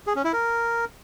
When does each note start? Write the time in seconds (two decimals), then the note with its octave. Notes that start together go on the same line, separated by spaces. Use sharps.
0.07 G#4
0.16 C#4
0.24 E4
0.33 A#4